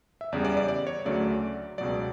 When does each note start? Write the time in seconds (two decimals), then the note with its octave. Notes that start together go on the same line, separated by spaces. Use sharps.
0.21 E5
0.32 E2 C#3 G3 D5
0.45 D5
0.57 D5
0.68 D5
0.87 C#5
1.05 D2 C#3 F#3 A3 D5
1.78 C#2 B2 F#3 D5